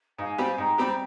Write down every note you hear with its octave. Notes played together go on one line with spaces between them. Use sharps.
G#2 F5 G#5
G3 C4 G4
G#2 G5 A#5
G3 C4 G4